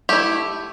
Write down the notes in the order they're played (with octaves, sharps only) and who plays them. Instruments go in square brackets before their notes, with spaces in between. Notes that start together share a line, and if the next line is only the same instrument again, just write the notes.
[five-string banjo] A3 E4 G4